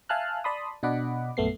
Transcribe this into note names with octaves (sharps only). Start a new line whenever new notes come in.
E5 F5 G#5 A5 F6 F#6
D5 A5 B5 C6 D#6
B2 D4 D#5 F#5 B5 D6
A#1 F#2 A3 B3 C7